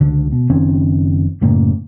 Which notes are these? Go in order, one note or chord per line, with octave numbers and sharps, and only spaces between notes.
C#2 D3
B2
F#1 D#3 C4 C#4
F#2 A2 C#3 A#3